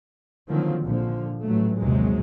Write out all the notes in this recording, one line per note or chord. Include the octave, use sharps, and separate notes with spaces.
D3 D#3 F3 F#3 A#3 C4
A#1 D3 F3
A1 F#3 A3
A#1 D#2 C3 F#3 G#3